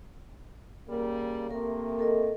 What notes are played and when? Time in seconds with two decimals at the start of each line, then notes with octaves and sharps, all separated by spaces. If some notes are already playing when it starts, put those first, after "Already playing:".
0.89 C#3 G3 A#3
1.51 C3 A3 A#3 A#4
1.99 A4 A#4 D#5